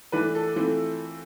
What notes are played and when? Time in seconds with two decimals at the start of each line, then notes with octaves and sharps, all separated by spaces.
0.12 E3 A3 D4 B4
0.35 A4
0.56 E3 A3 C4 F4